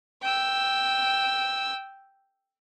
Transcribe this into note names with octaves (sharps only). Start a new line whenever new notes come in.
G5 E6